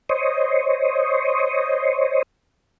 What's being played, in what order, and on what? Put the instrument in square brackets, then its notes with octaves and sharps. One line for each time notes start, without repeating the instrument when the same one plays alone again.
[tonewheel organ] C5 C#5 D#5